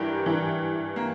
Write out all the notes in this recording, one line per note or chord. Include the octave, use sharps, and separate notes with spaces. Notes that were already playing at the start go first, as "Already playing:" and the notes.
Already playing: G2 E3 G4 A#4
G2 E3
A#3